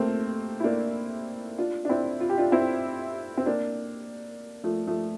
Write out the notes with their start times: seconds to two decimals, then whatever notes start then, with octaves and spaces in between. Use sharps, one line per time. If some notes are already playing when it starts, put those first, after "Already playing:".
Already playing: A3 A#3 C4
0.60 E4
0.64 A#3 D4
1.58 D4 F4
1.85 D4
1.89 C4 E4
2.20 F4
2.29 G4
2.38 D4 F4
2.52 C4 E4
3.37 C4
3.46 A#3 D4
4.64 F3 A3
4.87 F3 A3